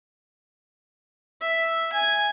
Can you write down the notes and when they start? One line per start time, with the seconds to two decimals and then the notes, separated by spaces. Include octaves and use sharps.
1.41 E5
1.92 G#5